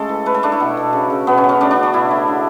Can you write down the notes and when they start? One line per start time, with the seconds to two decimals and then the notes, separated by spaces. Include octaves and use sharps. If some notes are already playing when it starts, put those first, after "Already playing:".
Already playing: C#3 G#3 A3 A4
0.09 E3
0.26 A3 B4
0.34 A4
0.43 A3 D4
0.52 E4
0.60 B2
0.77 B2
0.93 C#3
1.10 C#3
1.27 B2 B3
1.37 C#4
1.44 F#3
1.49 C#4
1.60 A3 D4
1.71 D4
1.76 C#3
1.83 F#4
1.93 B2 E4
2.11 A3
2.28 D3